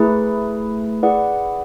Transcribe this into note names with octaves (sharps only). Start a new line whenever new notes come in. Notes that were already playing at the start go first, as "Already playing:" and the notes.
Already playing: A3 E4 G#4 B4
E4 G#4 B4 D5 F#5